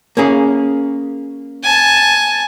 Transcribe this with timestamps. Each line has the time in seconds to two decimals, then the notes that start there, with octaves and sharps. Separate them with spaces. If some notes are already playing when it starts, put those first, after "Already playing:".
0.17 A#3 C#4 G#4
1.63 G#5 A5